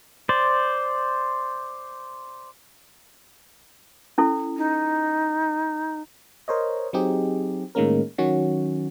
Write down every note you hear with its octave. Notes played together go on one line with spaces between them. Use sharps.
C5 D5
C#4 E4 A4
D#4
A#4 C5 C#5 D#5
F#3 C4 D#4 G4 G#4
A2 D#3 G#3 A#3 C#4 A#4
D#3 F#3 C#4 F#4